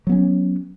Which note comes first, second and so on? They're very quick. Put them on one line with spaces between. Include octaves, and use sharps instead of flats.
F#3 B3 C#4